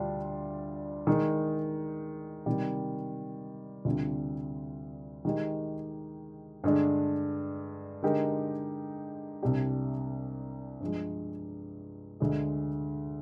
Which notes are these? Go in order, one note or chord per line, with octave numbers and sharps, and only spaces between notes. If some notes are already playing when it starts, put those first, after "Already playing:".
Already playing: D2 D3 G3 D4 F4
D#3 G#3 D#4
C3 D#3 G3
D2 C3 G3 D4 F4
D#3 G#3 D#4 G4
G2 D3 G#3 D4
D3 G#3 D#4 G4 A#4
C2 C3 G3 D4 G4
G2 F3 G#3
D2 D3 G#3